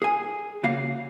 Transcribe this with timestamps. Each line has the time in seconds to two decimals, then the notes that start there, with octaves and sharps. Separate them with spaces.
0.02 G#4 G#5
0.63 C#3 A#3 F#4 F5